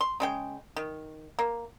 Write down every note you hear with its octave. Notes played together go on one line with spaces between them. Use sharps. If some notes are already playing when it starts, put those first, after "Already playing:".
C6
C#3 G#3 G5
D#3
A#3